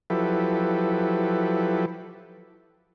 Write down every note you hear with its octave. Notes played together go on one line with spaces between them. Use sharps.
F3 F#3 E4 G4 A4 B4